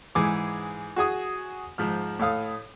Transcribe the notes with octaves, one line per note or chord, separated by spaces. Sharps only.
G#2 E3 G#4 D6
F#4 G#4 G#5 D#6
G#2 F3 F6
A2 A4 F5 D#6